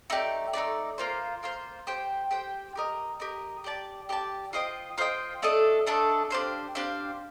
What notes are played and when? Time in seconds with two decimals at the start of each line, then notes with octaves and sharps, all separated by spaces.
0.10 A3 D#4 G4 D5
0.53 A3 D#4 G4 D5
0.98 A#3 F4 C5
1.43 A#3 F4 C5
1.87 G4 C5 G5
2.31 G4 C5 G5
2.76 G4 A#4 D#5
3.20 G4 A#4 D#5
3.64 G4 D5 A5
4.09 G4 D5 A5
4.53 F4 C5 D#5 G5
4.98 F4 C5 D#5 G5
5.42 A3 D4 A4 D#5
5.86 A3 D4 A4 D#5
6.30 D4 G4 C5 F5
6.75 D4 G4 C5 F5